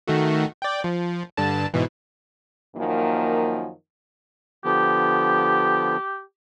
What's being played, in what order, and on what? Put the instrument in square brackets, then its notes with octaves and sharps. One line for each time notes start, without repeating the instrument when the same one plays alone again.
[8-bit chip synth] D#3 A3 F#4
D5 G5
F3
G2 D3 A5
G#2 B2 E3
[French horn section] F#2 D#3 F3 A#3
[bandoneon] D3 F3 B3 [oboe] G4